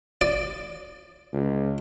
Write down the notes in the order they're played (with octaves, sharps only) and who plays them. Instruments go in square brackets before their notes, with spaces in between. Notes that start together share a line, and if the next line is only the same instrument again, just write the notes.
[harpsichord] D5
[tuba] C#2